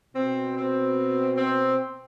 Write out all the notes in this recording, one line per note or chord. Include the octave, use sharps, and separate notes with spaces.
B2 C4
C4
C4